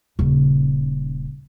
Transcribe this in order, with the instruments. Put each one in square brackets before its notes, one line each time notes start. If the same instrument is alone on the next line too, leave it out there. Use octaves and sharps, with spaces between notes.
[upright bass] D#1 C#3